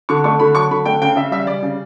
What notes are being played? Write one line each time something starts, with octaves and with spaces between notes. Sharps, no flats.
D3 C#6
A3 C#6
D3 B5
F#3 C#6
D3 B5
A3 G5
C#3 G5
C#3 E5
G3 E5
G3 D5
C#3